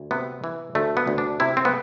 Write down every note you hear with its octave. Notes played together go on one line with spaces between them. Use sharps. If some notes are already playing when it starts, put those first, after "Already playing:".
Already playing: D2
C3 B3
E3
D2 A3
B3
D2
D4
C3 E4
C4
B3